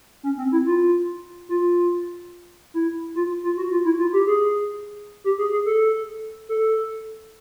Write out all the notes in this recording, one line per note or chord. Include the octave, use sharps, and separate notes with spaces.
C#4
C4
E4
F4
F4
E4
F4
F4
F#4
F4
E4
F4
G4
G#4
G4
G#4
G#4
A4
A4